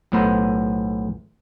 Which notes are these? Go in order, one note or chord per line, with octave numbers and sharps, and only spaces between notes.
B1 A2 B3 C5 A#5